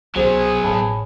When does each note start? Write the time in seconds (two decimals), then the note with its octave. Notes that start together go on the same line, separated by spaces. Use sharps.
0.16 C2 F#3 B3 C#4 G#4 C5
0.64 A1 C#5 A5 B5